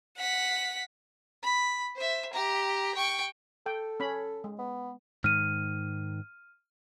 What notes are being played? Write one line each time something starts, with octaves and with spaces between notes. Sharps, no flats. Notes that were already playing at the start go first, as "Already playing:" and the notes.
F#5 B6
B5
C5 E5
G4 A#5
G5 C#6
A4 G5
C#4 B5
G#3
B3
G#2 D#3 F6 D#7